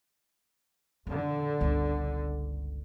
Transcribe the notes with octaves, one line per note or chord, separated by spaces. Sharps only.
E2 D3
G1 C#2